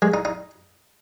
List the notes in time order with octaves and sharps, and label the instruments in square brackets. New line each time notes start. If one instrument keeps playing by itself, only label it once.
[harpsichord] G#3
D#4
D#4